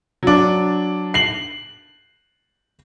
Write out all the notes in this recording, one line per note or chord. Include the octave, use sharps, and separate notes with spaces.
F#3 D4
C7 F#7